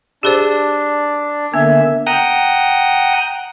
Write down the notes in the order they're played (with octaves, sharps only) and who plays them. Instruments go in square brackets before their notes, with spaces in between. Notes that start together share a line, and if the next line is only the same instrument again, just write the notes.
[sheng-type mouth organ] D4 [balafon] G4 G#4 C5
[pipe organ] D3 A#3 E5 [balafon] B3
[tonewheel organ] F#5 G5 A#5 D#6